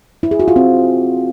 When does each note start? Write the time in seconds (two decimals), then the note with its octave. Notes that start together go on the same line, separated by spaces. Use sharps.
0.23 E4
0.31 G#4
0.40 F#4
0.48 F4
0.56 C4